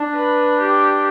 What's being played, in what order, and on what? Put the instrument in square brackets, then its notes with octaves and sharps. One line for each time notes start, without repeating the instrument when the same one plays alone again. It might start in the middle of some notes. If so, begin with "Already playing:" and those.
Already playing: [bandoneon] D4
[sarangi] B4
G4